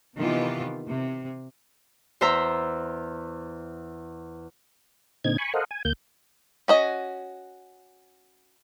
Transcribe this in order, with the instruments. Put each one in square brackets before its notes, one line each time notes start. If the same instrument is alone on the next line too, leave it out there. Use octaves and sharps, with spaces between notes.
[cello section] C3 D#3 E3 B3 F4 G4
C3
[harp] E2 C5 E5 A#5
[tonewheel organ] A#2 D3 C4 D#4 G#6
G#5 B5 C#6
A4 A#4 C5 D#5 F5 F#5
G#5
D2 A#3 G6
[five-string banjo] C#4 F#4 D#5